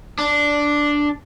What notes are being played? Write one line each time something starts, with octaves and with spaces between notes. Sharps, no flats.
D4